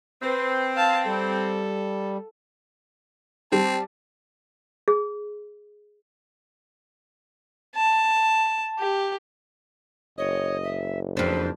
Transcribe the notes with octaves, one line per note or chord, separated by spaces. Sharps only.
C4 B4
F5 A5
G3 A4
G3 C4 A5
G#4
A5
G4
F#1 C#5 D#5
E5
F2 G#2 D4 B4 C5